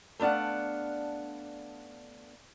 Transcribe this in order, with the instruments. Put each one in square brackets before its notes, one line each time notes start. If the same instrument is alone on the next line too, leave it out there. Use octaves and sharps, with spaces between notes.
[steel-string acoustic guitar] A3 B3 D4 F5 F#5